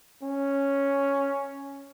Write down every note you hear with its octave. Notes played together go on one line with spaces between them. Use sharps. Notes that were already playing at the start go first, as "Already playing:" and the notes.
C#4